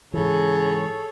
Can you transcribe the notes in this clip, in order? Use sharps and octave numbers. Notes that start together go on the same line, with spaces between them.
G#2 C#3 E3 G#4 A4 C#5